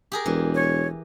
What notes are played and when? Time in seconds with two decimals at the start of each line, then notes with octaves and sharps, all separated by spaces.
0.12 G4 G#4 A#4
0.26 E1 E3
0.55 C#5